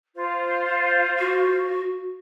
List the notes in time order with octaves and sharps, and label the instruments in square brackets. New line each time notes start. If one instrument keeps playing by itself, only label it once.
[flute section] F4 C5 F5
[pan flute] F#4